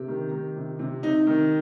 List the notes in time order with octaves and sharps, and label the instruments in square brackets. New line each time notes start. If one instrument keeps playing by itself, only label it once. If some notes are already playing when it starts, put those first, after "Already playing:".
Already playing: [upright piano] C3 G4
D#3
D#3
C3
C3
C3 D#4
D#3